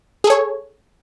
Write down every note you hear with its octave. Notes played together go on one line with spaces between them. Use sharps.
G#4 A4 C#5